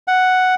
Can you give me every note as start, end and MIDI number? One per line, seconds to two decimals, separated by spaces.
0.08 0.55 78